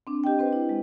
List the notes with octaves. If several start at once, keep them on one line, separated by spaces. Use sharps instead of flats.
C4 D4
G4 D#5 G5
C4 B4 C5
E4
G#3